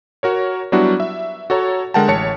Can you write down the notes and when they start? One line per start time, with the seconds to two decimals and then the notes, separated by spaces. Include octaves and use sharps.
0.23 F#4 A#4 C#5
0.72 F#3 G3 B3 D4 E4 F#4
1.00 E5
1.50 F#4 A4 C#5 A#5
1.94 D3 G#3 A#4 F#5 G5 A5
2.08 A1 C#5 A5 C#7